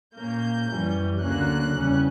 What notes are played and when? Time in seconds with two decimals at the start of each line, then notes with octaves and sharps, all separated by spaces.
0.16 A#2 A#3 C#4 G6
0.68 F#2 E3 G3 C#4
1.21 D2 D3 F#3 A#3 C#4 F#6
1.74 E2 C#3 G3 C#4